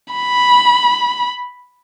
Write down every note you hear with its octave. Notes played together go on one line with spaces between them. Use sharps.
B5